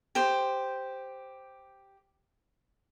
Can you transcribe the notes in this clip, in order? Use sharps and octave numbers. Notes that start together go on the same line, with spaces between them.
G4 C5